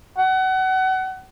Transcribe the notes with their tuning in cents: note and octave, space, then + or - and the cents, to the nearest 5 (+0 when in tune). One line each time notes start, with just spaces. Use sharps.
F#5 +30